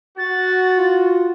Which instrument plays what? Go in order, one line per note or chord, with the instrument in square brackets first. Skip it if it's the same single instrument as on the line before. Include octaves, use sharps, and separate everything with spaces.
[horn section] F#4 [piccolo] A6
[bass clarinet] F4